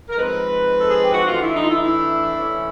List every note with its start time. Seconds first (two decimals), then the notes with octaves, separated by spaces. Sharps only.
0.10 A#4
0.16 F3 G#3 C4 D#4 B4
0.78 A4
0.90 G#4
1.02 G4
1.13 F#4
1.25 E3 A3 D4 F4
1.40 E4
1.54 D#4
1.62 F4
1.67 E4
1.81 E4
2.35 E3 A3 C#4